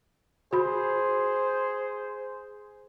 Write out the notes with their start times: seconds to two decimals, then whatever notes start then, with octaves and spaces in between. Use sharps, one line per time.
0.53 F#4 G#4 C5 B5